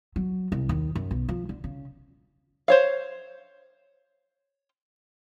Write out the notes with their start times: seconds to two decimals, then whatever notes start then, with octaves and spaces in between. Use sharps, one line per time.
0.16 F#3
0.52 C2
0.69 D#2
0.95 F#2
1.11 B1
1.29 F3
1.49 D3
1.64 C#3
2.68 C5 C#5 F5